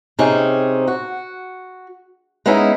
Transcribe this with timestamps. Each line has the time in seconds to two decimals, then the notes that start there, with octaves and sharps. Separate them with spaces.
0.19 C3 C4 C#4 D#4 G#4
0.87 F#4
2.46 G#3 B3 C#4 D#4 E4